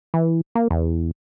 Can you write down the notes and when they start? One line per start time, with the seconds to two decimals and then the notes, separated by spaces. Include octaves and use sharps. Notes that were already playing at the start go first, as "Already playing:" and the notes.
0.14 E3
0.55 A#3
0.71 E2